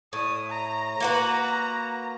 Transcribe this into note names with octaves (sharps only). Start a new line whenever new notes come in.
A2 D#6
A#5
A#3 F#4 B4